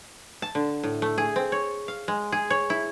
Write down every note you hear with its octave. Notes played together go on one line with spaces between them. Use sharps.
A5
D3
A2
A3
G#4
C4
C#5
F5
G#3
G#4
C#5
E4